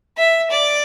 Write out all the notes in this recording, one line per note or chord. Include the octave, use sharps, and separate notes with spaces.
E5
D5